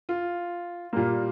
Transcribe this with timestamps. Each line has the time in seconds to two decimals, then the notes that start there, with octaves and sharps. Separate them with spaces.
0.09 F4
0.93 A#2 G3 A#3